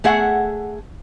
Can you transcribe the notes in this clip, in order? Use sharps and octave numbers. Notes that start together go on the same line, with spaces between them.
A3 G#4 E5 F#5